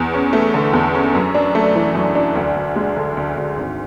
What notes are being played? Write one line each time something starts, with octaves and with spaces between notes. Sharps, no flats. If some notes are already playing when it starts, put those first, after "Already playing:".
Already playing: E2
C#4
A3
D3
E2
C#4
F#2
D4
A3
E3
F#2
D4
D2
D2
G#3
D3
D2
D2
G#1